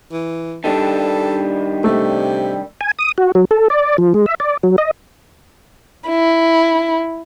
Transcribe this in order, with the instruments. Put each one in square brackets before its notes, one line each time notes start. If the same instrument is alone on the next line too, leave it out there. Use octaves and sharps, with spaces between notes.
[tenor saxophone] E3
[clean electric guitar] D#3 G3 D4 [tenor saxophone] A4
[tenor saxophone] C3 [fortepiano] A3
[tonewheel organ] G#5
D#6
F#4
F#3
A4
D5
F3
G#3
E5
D5
F#3
D#5
[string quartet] E4